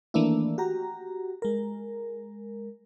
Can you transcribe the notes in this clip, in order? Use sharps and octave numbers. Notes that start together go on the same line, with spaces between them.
D#3 E3 A3 A#3 D4 E4
F#4 G4 A#5
G#3 A#4